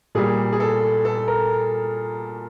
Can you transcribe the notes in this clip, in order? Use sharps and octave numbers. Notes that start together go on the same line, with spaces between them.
A#2 G3 G#4
G#4
A4
A4
A#4